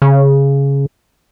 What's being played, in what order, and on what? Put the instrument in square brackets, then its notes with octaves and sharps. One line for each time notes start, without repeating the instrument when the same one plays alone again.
[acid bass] C#3